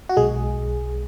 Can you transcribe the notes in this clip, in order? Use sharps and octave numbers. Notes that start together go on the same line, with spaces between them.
F#4
B1 G#3 G#4